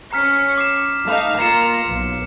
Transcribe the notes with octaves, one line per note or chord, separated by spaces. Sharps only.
C#4 A#5 F6 B6 C#7
D6 C7 E7
A3 D#4 F5
A#3 F4 A#5 C7 C#7 E7
B1